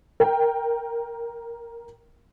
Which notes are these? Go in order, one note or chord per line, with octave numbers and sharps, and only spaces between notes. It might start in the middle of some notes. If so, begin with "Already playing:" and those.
A#4 G5